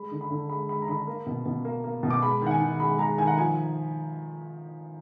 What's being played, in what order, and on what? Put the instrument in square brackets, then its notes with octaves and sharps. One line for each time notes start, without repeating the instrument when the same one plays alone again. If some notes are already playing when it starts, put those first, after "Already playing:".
Already playing: [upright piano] G#3 B5
D3
B5
D3
G#3 B5
G#3 B5
A#5
D3 B5
A#3
B2
B2
A#3
A#3
B2
D6
G#3 B5
D#3 F#5
G#5
D#3
G#3 B5
G#3 A#5
D#3 G#5
F#5
F3 G#5